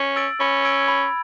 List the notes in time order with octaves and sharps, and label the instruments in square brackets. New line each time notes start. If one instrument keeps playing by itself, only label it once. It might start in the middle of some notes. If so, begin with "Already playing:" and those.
Already playing: [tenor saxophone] C#4
[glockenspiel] E6 A6 D7 F#7
[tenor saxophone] C#4 [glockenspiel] B5
[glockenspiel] E6 G#6 D7
B5